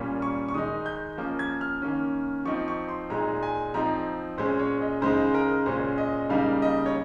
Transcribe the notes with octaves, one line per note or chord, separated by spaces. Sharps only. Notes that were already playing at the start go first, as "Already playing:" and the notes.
Already playing: A#2 G3 A#3 C#4
C#6
C#6
D#3 G#3 D#4 D#6
G6
F3 A#3 C#4
G#6
F6
D#3 A#3 C#4
F3 C4 D#4 C#6
C#6
C6
A#2 G#3 D#4 A#5
G#5
F3 C4 D#4 A#5
A#2 G#3 C#4 C5
C#5
D#5
C#3 G#3 D#4 C5
A#4
A#2 G#3 C#4 C5
D#5
C#3 G3 A#3 D#4 F5
D#5
C#5